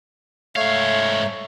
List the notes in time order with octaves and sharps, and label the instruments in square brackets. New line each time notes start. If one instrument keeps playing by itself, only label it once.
[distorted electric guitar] G#2 F5 [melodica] A3 C#5